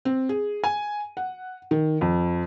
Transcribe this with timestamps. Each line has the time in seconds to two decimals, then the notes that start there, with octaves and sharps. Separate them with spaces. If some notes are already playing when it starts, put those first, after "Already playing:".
0.05 C4
0.29 G#4
0.64 G#5
1.17 F#5
1.71 D#3
2.01 F2